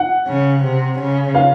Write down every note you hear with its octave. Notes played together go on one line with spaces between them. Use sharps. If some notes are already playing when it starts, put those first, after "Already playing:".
Already playing: F#5
C#3
C3
C#3
F5